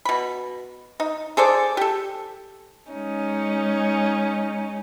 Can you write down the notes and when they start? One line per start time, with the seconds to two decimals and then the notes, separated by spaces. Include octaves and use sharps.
0.05 B2 B5
1.00 D#4
1.37 G#4 A4 C5 D5
1.77 G4 A4
2.91 G#3 C#4 D#4